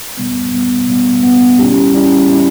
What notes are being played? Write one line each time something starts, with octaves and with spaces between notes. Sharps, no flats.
B2 G3 B3
B2 G3 B3
B2 G3 B3
B2 G3 B3
G3 C#4 E4 G4
G3 C#4 E4 G4
G3 C#4 E4 G4